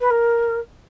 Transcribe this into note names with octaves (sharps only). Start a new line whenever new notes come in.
B4
A#4